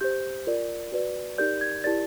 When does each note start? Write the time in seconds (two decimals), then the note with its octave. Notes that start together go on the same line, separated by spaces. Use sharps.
0.01 G4 C5 G6
0.47 F4 A#4 D5
0.92 F#4 B4 D5
1.38 D#4 G4 A#4 D5 G6
1.61 G#6
1.84 E4 G4 A#4 D5 A6